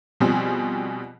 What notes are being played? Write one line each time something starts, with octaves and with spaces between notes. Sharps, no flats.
B2 F3 G3 C4 G#4